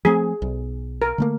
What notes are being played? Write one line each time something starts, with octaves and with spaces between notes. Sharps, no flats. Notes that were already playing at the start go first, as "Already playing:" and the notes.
F3 A3 C4 G#4
B1
A#4
D3 A3 A#3